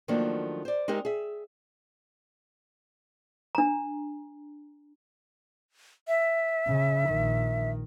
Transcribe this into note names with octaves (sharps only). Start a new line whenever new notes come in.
D#3 F3 F#3 A3 A#3 D4
C5 D5
G#3 C4 D#4 G4 A#4
G#4 E5
D4 A#5
E5
C#3
A#1 D#3